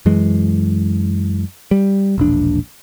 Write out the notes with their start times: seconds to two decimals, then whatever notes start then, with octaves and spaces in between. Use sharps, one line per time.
0.06 F#2 E3 G#3
1.71 G3
2.18 E1 A#1 D4